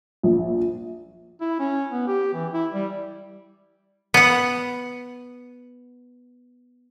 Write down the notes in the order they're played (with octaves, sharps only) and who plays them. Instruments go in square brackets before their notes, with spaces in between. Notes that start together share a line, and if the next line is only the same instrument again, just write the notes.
[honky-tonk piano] A#1
[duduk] E4
C#4
B3
G4
E3
E4
G3
[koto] B3 F#5